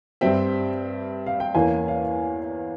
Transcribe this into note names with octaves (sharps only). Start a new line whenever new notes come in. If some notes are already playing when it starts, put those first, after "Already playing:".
G2 G3 C4 E5 G5
F5
G5
E2 E3 A#3 C#4 F5 G#5
C#5 F5